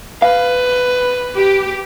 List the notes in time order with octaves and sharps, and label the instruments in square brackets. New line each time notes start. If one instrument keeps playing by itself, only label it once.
[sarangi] B4 [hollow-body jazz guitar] F5
[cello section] G4